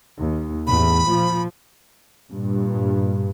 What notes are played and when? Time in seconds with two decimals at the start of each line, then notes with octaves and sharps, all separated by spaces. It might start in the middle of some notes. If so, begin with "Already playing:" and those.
0.15 D#2
0.67 A1 E2 B5
1.05 A#2 F3
2.32 G2 A#2